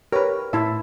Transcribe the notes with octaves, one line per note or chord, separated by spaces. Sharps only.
G4 A#4 B4 C#5
A2 E4 E5 A5